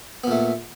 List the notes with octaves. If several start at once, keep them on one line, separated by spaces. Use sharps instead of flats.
A#2 A3 B3